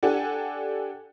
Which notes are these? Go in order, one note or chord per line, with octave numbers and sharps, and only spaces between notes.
D4 G4 A4 F#5 G#5